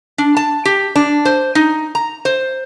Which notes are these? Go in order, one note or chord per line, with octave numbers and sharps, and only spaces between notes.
D4
A5
G4
D4
C5
D#4
A#5
C5